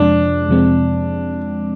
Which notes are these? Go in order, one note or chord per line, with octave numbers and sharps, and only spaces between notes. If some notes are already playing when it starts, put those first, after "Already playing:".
Already playing: F2 C3 F3 G#3 C4 D4
F2 C3 F3 G#3 C4